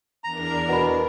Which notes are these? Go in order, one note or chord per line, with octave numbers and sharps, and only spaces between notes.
E2 D4 A#4 A#5
B2 F#5 B5